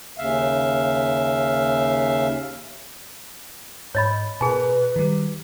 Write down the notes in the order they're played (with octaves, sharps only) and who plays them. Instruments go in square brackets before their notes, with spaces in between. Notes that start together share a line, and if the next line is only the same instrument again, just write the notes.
[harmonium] D#2 C#3 E5 F5
[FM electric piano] G#2 [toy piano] C#5 D#5 B5
[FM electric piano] B2 A#4 [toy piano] G#4 G#5 [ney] B4
[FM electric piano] D#3 G3